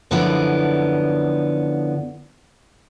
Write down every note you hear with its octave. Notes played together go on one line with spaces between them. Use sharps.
F#2 D3 F3 B3 E4 D5